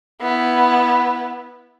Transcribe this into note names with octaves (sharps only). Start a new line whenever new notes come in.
B3 E4